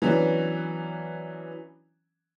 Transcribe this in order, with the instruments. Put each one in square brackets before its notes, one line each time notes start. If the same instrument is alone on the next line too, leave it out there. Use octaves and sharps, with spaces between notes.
[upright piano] E3 F#3 B3 C#4 D4